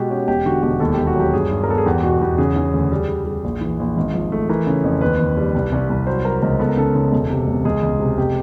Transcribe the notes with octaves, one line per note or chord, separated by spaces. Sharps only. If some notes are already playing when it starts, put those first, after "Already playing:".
Already playing: B2 G#3 F#4 G4
C#4 G4
E1 G4
D3 F#4
E1 G4
D#2 A4
G4
D#2
F#4
F#3 G4
G2 G#4
G2
A#4
B3 A4
G#4
E2 G4
B2 F#4
E2 G4
C#3 G#4
C#3
D2
G3
G3
G3
A#1
E3
A#1
G#1
F3
A3
E3 A#4
C#3
F2
D#2 B4
D#2
G3
C2
C2
C2
F#3 C5
F#3 A#4
C#2 A#4
B3 A4
A#4
C#3 A4
C#3
E1
C3
E1
C#2 G#4
C#2
C3
F1 G4